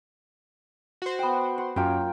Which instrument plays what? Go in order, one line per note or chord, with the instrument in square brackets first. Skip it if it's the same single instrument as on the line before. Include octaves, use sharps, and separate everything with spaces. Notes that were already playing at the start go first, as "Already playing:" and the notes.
[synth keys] F#4 C5
[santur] B3 G5
F#5 C6
[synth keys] F#2 [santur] A#3 F4 G5